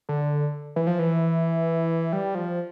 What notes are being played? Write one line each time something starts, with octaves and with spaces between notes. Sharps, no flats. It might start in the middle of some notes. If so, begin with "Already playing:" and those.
D3
E3
F3
E3
G3
F3